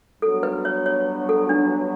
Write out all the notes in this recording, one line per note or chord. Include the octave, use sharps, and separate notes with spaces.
G2 F#3 B3 A4
B4
C#5
C#5
A4
D4